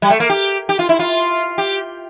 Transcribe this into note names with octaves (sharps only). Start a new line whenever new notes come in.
G3
A3
A#3
G4
G4
F4
E4
F4
G4